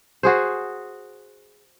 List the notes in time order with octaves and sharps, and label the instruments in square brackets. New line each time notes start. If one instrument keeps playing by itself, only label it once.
[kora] F#4 G#4 C5